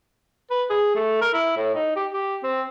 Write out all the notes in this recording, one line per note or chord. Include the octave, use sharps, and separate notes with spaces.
B4
G#4
A3
A#4
E4
A2
D#4
G4
G4
C4